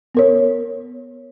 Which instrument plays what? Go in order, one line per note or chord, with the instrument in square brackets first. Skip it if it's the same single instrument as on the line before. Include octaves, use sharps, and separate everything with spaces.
[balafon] B3 A#4 C#5